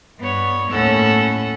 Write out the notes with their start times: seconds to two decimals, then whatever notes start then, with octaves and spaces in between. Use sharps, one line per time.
0.20 G2 B3 C#5
0.71 D#2 A2 C#4 A4 F#5 E6